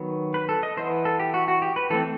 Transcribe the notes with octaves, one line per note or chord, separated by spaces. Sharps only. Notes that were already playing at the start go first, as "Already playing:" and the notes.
Already playing: D#3 F#3 B3
B4
A4
D#5
E3 B3 C5
A4
G4
F#4
F#4
G4
B4
E3 A3 C4 A4